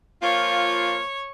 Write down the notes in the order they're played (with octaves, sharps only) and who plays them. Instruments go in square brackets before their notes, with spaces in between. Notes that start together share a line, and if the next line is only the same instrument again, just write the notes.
[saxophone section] F3 A#3 F4 [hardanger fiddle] C#5